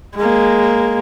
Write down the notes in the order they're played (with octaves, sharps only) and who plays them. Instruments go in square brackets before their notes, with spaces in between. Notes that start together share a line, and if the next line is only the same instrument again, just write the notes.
[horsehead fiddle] G#3 A#3